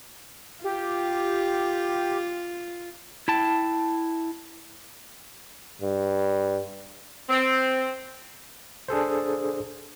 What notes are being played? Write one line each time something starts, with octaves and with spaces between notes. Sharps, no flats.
F4 G4
E4 G5 A5
G2
C4
D4 G#4 A4 C5